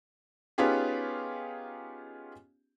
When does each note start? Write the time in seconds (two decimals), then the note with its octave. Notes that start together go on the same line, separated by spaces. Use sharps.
0.58 B3 C#4 D#4 F4 G4 G#4